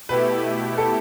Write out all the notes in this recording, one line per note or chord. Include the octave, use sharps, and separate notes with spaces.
B2 A3 E4 G4 B4
A4